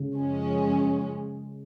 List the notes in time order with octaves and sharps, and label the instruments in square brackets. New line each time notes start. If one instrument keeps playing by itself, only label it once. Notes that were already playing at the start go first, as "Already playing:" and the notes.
Already playing: [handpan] C#3
[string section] F#2 F3 G#3 C#4